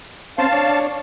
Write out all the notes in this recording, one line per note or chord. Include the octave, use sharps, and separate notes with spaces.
C4 C#4 C5 F5 A5
D4 C#5